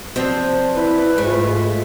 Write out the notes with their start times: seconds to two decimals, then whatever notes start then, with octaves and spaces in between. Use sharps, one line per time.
0.16 F3 F#3 C4 D4
0.74 E4 B4
1.18 G#2 G#3 A3 F4 C5 B6